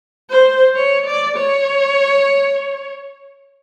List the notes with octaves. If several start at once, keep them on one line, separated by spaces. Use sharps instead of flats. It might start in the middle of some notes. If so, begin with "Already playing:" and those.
C5
C#5
D5
C#5